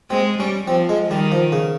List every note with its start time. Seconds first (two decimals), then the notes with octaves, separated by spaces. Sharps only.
0.10 G#3 C4
0.39 G3 C#4
0.67 F3 C4
0.89 G#3
1.10 D#3 G3
1.32 F3
1.52 C#3